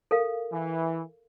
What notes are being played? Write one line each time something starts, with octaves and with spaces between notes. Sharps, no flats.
A4 A#4 F5
E3